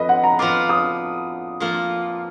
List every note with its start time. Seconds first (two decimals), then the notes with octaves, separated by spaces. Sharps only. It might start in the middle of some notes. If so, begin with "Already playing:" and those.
Already playing: F2 F3 B4 D#5
0.09 F#5
0.24 A#5
0.39 F3 B3 F4 D6
0.69 D#6
1.60 F3 A#3 F4